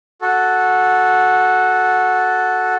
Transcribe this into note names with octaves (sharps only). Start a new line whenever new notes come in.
F#4 A4